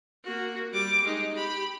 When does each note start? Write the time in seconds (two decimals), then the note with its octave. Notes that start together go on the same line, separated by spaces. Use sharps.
0.24 A#3 F#4
0.73 G3 D6
1.04 G#3 D#4
1.35 G4 B5